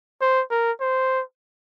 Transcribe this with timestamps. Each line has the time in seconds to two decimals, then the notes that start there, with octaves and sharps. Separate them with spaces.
0.21 C5
0.51 A#4
0.81 C5